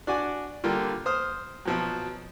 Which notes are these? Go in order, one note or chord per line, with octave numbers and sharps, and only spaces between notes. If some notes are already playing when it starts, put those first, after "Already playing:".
D4 F#4 D5 G#5
D3 G3 A#3 F4
C5 D#6 F6
B2 F3 F#3